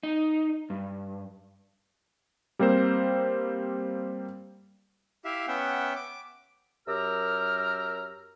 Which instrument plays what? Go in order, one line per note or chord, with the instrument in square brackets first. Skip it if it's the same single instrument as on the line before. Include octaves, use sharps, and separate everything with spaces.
[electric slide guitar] D#4
G2
[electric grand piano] G3 A#3 C4 A#4 C5
[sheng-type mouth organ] E4 G4 E5 F5
B3 C#4 E5 F#5 G5
D6
[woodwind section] F#2 G4 A#4 A#5 E6 F6